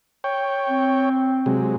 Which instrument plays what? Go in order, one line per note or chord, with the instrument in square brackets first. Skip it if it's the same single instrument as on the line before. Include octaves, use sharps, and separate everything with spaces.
[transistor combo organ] C#5 G5
[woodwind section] C4
[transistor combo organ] C3 F#3 G#3